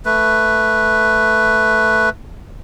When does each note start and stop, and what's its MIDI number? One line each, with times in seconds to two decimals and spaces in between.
0.05 2.09 57
0.05 2.09 71